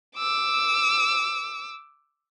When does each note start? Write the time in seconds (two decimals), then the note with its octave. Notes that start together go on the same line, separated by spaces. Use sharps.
0.18 D6 E6